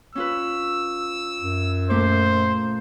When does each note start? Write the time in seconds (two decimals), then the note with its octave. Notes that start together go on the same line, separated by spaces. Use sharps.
0.15 C#4 F4 B4 E6
1.42 F#2
1.90 A#2 A3 C5 D6